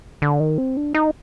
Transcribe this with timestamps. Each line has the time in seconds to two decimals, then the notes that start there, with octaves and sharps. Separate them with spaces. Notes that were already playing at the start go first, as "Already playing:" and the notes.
0.22 D3
0.40 D#3
0.58 C4
0.77 D4
0.94 D#4